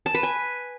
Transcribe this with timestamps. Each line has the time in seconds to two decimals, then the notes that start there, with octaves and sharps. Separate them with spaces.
0.06 A5
0.14 B4
0.23 G#5